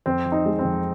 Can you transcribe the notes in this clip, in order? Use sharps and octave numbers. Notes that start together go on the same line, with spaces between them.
F2 C4
F3
D#4
G#3
C4
F2